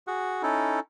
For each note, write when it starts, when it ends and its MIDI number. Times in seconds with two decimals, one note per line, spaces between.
0.07 0.42 66
0.07 0.42 68
0.07 0.42 78
0.43 0.80 61
0.43 0.80 63
0.43 0.80 64
0.43 0.80 69